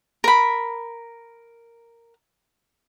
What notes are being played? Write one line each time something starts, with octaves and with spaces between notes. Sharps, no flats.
A#4 B5